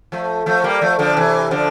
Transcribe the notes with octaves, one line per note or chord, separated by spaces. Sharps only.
F3 A3
F3 A3
G3 A#3
F3 A3
D3 F3
C3 E3
D3 F3